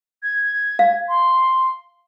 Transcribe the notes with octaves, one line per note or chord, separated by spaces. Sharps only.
G#6
F5
C6